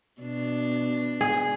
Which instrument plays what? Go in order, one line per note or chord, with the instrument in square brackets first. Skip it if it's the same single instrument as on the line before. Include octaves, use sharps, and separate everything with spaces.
[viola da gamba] B2 D4
[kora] G#4